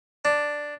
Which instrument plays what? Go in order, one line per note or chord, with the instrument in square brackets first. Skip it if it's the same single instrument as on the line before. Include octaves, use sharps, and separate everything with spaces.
[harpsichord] D4